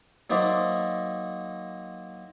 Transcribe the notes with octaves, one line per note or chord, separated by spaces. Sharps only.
F#3 A#3 D#4 C5 D5 E5